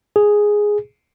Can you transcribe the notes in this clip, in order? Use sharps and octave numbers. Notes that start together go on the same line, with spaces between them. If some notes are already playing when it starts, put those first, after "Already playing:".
G#4